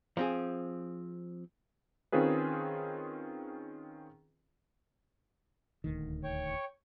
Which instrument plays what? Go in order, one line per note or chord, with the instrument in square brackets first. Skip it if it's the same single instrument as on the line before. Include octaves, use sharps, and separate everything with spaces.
[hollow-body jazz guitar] F3 C4 G#4
[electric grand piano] D#3 C4 C#4 F4 G#4 B4
[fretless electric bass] D#1 D2 D#3
[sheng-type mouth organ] C#5 G5 C#6